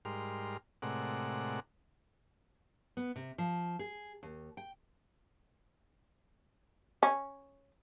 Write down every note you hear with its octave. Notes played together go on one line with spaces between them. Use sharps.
G#2 G3 A#4 C6 F6
A2 C3 G#3 A#4 D5 F#5
B3
C3
F3
G#4
D#2
G5
C#4